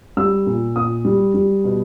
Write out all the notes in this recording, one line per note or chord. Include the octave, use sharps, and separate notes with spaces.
G3 E6
A#2
A#2 D#6
G3
G3
B2